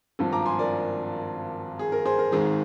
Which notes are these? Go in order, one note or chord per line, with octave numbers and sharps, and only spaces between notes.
G#1 G2 F3
A#5 D6
G#5 C6
A#4 D5
G#4
A#4
G#4 C5
A#4
G#1 G#2 D#3 G#4